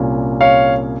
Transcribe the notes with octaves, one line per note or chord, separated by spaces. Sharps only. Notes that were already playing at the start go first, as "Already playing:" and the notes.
Already playing: C2 A#2 G3 C#4
C#5 F5